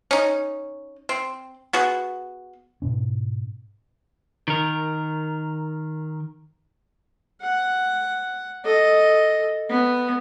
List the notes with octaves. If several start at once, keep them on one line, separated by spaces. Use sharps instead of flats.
C#4 D#4
C4
B3 F#4 G#4
G#2 B2 C#4
D#3 A#4
F#5
A4 D#5
B3